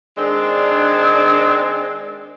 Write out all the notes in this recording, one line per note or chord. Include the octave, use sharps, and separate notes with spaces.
D#3 G#3 C4 D4